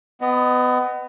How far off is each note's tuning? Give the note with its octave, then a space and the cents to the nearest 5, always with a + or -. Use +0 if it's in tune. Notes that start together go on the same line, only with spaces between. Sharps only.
B3 +25 D#5 -20